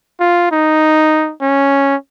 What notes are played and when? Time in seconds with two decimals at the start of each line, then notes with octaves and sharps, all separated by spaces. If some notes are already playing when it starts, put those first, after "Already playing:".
0.20 F4
0.51 D#4
1.41 C#4